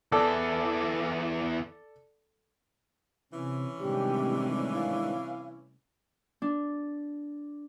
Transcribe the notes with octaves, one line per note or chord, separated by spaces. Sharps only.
E2 E3 A4 D5
C3 E3 C#4
A2 C3 D#3 G3 G#3 D4 G4
F5
D4